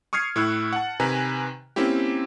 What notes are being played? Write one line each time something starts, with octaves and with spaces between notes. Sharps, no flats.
C#6 D#6 F6 G#6 C7
A2 E4 C#6 E6 F#6
F#5 A5
C3 D#3 B4 G#5 A#5
A#3 C4 C#4 E4 G4